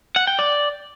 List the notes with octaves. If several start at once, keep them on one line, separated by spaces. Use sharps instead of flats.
F#5
G5
D5